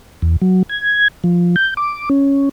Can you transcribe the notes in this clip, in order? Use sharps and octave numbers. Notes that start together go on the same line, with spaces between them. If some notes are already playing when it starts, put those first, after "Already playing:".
E2
F#3
G#6
F3
G6
D6
C#4